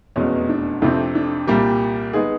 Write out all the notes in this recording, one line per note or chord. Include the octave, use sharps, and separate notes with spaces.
F1 E2 B2 G#3 C#4
D4
F2 C3 F3 A3 C4 D4
D4
C2 A#2 G3 A#3 G4
D#3 G#3 B3 G#4